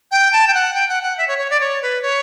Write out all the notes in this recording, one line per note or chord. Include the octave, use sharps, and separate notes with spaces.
G5
A5
G5
F#5
G5
F#5
F#5
E5
C#5
C#5
D5
C#5
B4
C#5